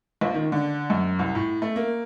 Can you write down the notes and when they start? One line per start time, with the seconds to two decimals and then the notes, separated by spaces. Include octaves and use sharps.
0.21 A#1
0.34 D#3
0.52 D3
0.90 F#2
1.19 C2
1.35 A2
1.62 A3
1.76 A#3